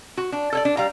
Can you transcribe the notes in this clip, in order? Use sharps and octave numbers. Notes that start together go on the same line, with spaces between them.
F#4
D4
A4 C#5 D5
D4
G3 F5 A#5